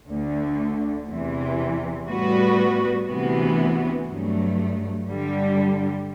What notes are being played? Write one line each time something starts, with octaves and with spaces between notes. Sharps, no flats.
D2 D3 A3
E2 C3 E3
A2 G3 B3 F#4 B4
D2 C3 E3 B3 F#4
G2 F#3 A3
G2 D3 G3